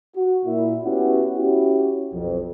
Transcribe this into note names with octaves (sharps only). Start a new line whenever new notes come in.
F#4
A#2 E4
B3 C#4 E4 F#4 G4
C#4 E4 F#4 G4
B1 F2